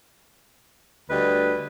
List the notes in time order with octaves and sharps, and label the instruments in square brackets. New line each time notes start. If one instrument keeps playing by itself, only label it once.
[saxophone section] D2 G3 B4 D#5